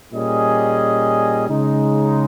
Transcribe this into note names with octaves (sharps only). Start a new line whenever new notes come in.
A#2 G3 C#4 G#4 D#5
C#3 G#3 D#4